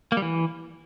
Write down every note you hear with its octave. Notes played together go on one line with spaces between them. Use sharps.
A#3
G3
E3